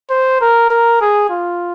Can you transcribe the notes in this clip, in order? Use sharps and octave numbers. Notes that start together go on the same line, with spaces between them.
C5
A#4
A#4
G#4
F4